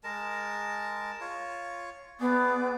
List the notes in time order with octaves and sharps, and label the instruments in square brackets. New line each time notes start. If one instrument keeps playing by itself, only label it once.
[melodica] G#3 A#4 A5
F4 C#5
[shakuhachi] B3 [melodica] G#4 D5